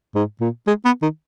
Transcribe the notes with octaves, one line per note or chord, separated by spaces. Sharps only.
G#2
A#2
G#3
B3
D#3